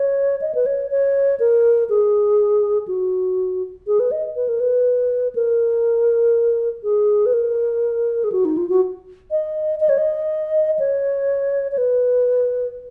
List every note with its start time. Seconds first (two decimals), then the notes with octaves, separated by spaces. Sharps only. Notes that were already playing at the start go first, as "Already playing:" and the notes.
Already playing: C#5
0.41 D#5
0.55 B4
0.66 C#5
0.91 C#5
1.40 A#4
1.90 G#4
2.88 F#4
3.87 G#4
4.00 B4
4.11 D#5
4.36 B4
4.48 A#4
4.60 B4
5.35 A#4
6.84 G#4
7.26 B4
7.33 A#4
8.24 G#4
8.32 F#4
8.45 D#4
8.57 F4
8.69 F#4
9.31 D#5
9.80 D#5
9.89 C#5
9.98 D#5
10.79 C#5
11.72 C#5
11.78 B4